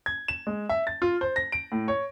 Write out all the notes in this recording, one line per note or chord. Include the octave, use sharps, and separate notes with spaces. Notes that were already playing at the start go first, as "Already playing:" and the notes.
G#6
E7
G#3
E5
A6
F4
C5
A#6
D7
A2
C#5